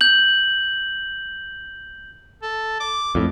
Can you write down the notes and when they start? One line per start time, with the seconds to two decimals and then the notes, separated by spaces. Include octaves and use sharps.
0.01 G6 F#7
2.43 A4
2.80 D6
3.15 F2 A2